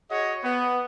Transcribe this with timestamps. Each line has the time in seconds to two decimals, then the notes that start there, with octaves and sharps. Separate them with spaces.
0.11 F#4 G#4 C#5 D#5
0.44 B3